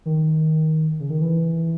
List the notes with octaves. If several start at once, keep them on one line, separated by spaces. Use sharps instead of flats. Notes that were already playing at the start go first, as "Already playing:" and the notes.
D#3
C#3
D#3
E3